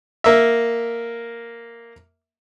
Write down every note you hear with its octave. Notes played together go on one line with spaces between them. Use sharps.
A#3 E5